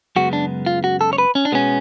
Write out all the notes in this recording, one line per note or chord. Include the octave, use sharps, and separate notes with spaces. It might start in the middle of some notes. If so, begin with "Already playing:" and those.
F#2 C#3 G#3 B3 F#4
D4
F4
F#4
A4
C#5
B4
C#4
D4
B2 G#3 B3 C#4